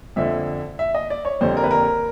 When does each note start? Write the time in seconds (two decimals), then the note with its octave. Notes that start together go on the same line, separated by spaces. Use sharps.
0.16 F2 D3 F3 E5
0.79 E5
0.95 D#5
1.10 D5
1.25 C#5
1.41 F2 D3 G3 A#3 C5
1.57 A#4
1.64 B4
1.71 A#4